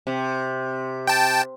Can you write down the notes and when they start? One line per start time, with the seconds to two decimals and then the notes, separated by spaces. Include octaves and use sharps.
0.07 C3
1.07 G5 A5